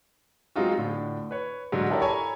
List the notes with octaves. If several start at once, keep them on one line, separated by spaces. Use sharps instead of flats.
F#3 G#3 C4 D#4 F4 F#4
A2 D3
B4 C#5
G#2 D3 F#3
E4 G4 A4 A#4 C#5 D5
A4 C#5 G#5 A#5 B5 C#6